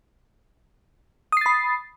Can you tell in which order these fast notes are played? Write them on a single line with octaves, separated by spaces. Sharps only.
D#6 C7 A6 B5